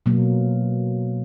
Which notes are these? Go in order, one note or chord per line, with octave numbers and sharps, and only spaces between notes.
B2 F#3 A#3